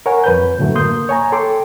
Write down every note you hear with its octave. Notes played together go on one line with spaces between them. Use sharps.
A#4 C#5 F#5 G#5
F2 B4 G6
F#2 A2 D3 F#3 A3
A#3 C6 D#6 G6
C#5 G#5 A#5
A4 G5 C6 D6